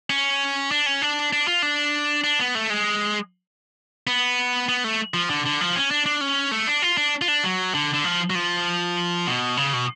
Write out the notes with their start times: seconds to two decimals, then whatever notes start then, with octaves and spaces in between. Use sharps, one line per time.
0.10 C#4
0.71 D4
0.86 C#4
1.02 D4
1.33 D4
1.48 F4
1.62 D4
2.24 D4
2.39 B3
2.55 A3
2.70 G#3
4.07 B3
4.69 B3
4.84 A3
5.14 F3
5.30 D3
5.46 D3
5.61 F3
5.76 C#4
5.91 D4
6.06 D4
6.21 C#4
6.52 A3
6.67 D4
6.82 F4
6.98 D4
7.21 F4
7.28 D4
7.44 F#3
7.74 D3
7.94 D3
8.04 F3
8.30 F#3
8.35 F3
9.27 B2
9.57 C#3
9.73 B2